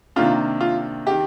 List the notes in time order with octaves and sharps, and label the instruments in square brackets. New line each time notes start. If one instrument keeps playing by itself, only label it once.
[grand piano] C3 D#3 A#3 D4 [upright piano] F4
[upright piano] F4
[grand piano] D#3 [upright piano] G4